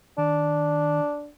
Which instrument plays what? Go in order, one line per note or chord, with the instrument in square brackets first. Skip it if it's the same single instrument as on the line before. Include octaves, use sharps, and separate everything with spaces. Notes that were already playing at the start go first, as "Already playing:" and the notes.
[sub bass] D#3 [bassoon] D4